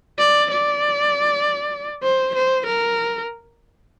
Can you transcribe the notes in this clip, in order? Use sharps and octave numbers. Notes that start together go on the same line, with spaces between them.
D5
D5
C5
C5
A#4